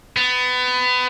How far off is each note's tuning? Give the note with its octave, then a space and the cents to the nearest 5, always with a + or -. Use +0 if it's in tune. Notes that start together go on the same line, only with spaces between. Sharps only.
B3 +25